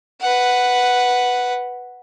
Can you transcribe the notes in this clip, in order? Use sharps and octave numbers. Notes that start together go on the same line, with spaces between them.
B4 F#5